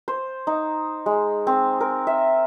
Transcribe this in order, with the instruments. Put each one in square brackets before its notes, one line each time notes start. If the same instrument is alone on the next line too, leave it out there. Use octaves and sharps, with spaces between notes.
[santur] C5
D#4
G#3
C4
A#4
E5